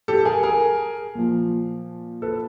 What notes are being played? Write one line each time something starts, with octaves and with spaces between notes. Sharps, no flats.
G4 A4
G#4 A#4
G#4 A#4
A#2 F3
A4 B4